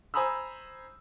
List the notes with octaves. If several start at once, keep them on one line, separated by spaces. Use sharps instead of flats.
C5 G#5 A#5 B5 D#6 E6